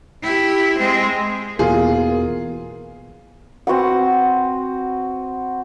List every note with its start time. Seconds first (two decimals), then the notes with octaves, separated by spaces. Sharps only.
0.22 E4 G4
0.78 G#3 C4
1.59 E2 B2 A#3 F4 G#4
3.67 C4 F#4 B4 F#5